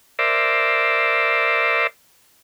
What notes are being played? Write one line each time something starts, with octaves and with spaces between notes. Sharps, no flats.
A#4 C5 D5 E5